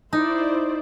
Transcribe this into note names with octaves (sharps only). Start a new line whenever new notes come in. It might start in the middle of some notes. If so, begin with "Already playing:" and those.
D#4 E4 C5 D5